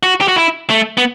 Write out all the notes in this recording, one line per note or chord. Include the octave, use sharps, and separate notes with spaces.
F#4
G4
F#4
E4
A3
B3